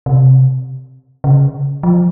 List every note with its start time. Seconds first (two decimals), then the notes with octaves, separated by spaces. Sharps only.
0.06 C3
1.24 C#3
1.83 F3